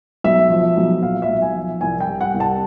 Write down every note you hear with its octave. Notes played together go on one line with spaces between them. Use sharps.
B1 E5
F3
B1
A#2 F5
E5
B1
G#5
F3
C2 G#5
G5
G3
F#5
C2
A5